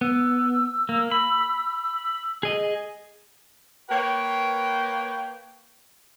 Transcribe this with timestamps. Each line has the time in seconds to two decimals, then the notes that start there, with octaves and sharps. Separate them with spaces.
0.01 B3 E6
0.89 A#3
1.11 B5
2.43 G#4 D#5
3.89 A#3 B4 C#5 G5